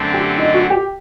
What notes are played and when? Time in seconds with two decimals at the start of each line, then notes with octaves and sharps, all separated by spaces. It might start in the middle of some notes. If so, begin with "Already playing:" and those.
Already playing: F#2 D3 A3 C4
0.14 G4
0.38 D#4
0.54 F#4
0.70 G4